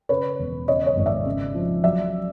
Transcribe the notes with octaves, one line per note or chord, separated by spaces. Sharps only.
C#3 B4 C#5
E1
C#3 C#5 D#5
C#5 D#5
G#1
D5 E5
C#3
F3
F#3 D5 E5